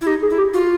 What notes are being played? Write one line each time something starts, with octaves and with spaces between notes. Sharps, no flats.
E4
D#4 G4
G#4
E4
G4
F4 F#4